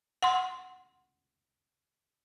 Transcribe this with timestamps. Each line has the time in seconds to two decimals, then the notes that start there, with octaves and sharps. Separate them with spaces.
0.22 F#5 C6